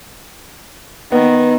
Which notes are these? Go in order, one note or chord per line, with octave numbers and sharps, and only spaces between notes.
D#3 B3